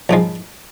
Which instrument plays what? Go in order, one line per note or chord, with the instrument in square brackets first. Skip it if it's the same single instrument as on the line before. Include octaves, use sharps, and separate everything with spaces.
[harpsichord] A#1 G#2 F3 G#3